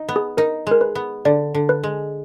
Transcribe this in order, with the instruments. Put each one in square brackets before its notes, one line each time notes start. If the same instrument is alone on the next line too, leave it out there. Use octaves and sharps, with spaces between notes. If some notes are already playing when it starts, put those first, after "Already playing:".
Already playing: [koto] D#4
B3
[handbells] G#4
[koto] D#4 [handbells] A#4
[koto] G#3 [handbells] A#4
[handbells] B4
[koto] B3
[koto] D3 [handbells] D5
[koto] D3
[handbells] B4
[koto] G#3